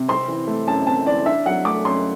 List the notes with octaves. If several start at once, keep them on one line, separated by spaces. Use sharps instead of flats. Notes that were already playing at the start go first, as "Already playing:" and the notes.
Already playing: C3
C4 C6
E3
A3
F#2 A5
C4 A5
E3 D5
D4 E5
F#3 F#5
A3 D6
F#2 C6